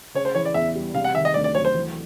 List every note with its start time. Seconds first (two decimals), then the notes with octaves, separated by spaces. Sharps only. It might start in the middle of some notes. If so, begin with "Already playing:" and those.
0.14 C#3 C#5
0.25 C5
0.35 E3 C#5
0.45 D5
0.54 E2 E5
0.75 G3
0.94 C3 F5
1.05 F#5
1.15 D#3 E5
1.25 D#5
1.34 D2 D5
1.44 D5
1.54 F#3 C#5
1.65 C5
1.75 E3